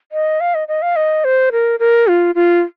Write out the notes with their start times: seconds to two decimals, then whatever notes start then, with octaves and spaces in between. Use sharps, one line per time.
0.12 D#5
0.40 F5
0.55 D#5
0.68 D#5
0.82 F5
0.96 D#5
1.24 C5
1.52 A#4
1.80 A#4
2.07 F4
2.35 F4